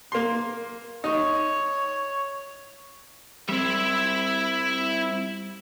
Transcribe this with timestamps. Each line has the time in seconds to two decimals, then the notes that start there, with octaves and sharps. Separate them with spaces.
0.12 A#3 C6
1.04 D#4 C#5
3.49 G3 C4 E4 E5